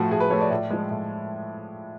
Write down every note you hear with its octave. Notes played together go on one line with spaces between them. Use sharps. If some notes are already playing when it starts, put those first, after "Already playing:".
Already playing: A2 F3 A3 F#4
A2 G#4
B4
F3 A3 C#5
D5
A2
F3 G#3
A2